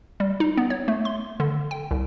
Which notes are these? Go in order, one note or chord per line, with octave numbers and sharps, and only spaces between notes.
G3
D#4
B3
C#5
A3
C6
D3
G5
C2